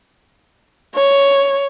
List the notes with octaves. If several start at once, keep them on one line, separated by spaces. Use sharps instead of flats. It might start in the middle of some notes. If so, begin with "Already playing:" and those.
C#5